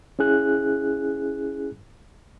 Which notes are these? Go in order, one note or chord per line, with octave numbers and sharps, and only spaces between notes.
C#4 E4 G#4 F#6